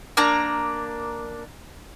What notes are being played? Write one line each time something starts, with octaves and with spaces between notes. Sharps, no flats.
A#3 D4 A#5